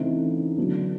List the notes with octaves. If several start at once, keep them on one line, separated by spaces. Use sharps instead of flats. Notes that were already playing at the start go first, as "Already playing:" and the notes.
Already playing: C#3 E3 A3 C4 D#4
D3 F#3 B3 D4